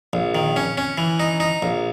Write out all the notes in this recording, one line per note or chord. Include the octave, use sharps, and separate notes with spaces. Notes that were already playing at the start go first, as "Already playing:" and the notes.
A#1
D#3
C#4
C#4
E3
D#4
D#4
A#1